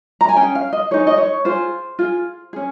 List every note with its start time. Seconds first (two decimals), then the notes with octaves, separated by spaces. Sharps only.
0.21 A#5
0.29 G#5
0.37 C#4 G#4 G5
0.55 F5
0.73 D#5
0.91 D#4 G#4 C#5
1.07 D#5
1.18 C#5
1.45 F4 G#4 C5
1.99 F4 G#4
2.53 C#4 G#4